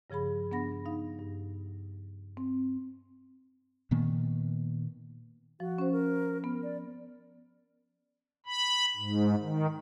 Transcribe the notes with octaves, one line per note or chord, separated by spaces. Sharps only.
G2 C#3 F3 G#4 B5
B3 D4 F#5 B5 A#6
D#4 F5
G2
C4
A#2 D#3 A#3 B3
F3 F#4
C#4 C5
A#4
B3
D5
B5
G#2
D#3